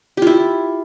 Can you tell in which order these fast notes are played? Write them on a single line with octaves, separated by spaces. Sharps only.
G4 F4 E4